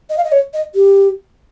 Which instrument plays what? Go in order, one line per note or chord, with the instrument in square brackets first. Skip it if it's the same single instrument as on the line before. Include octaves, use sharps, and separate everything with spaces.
[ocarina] D#5
F5
D#5
C#5
D#5
G4